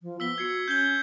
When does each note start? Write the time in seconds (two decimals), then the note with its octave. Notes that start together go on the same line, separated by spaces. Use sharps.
0.02 F3
0.20 B3 E6 B6 G7
0.38 F#4 G#6 C7 C#7
0.68 C#4 G6 G#6 G7